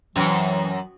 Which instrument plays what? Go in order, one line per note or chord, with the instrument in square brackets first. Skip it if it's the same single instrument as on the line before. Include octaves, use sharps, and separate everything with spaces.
[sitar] F#2 [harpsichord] E3 C4 [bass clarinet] F#3